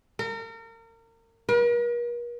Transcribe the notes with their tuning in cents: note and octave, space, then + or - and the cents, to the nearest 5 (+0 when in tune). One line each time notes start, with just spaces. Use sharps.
A#4 -35
A#4 +45